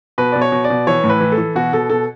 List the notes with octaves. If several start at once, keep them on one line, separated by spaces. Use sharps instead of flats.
B2 B4
D5
B2
C#5
B2
D5
B2
E3 C#5
A2
B4
E3
A4
E3
B2 F#4
B2 A4
B2 A4